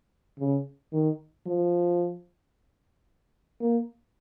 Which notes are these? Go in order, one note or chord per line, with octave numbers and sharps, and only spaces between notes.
C#3
D#3
F3
A#3